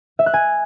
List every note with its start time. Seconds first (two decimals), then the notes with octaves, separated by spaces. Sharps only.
0.19 E5
0.26 F#6
0.34 G#5